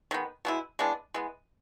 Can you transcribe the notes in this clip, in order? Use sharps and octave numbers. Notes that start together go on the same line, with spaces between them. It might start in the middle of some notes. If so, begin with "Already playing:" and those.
D#3 G#3 B3
B2 G#3 C4 E4
E3 G#3 B3 D4
E3 G#3 B3